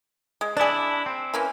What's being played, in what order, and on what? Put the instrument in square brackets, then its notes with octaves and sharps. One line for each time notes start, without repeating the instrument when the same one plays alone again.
[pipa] G#3
[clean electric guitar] D4 E4 [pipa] G#4 D5
[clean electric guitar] C4
[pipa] E3 A#3 C#4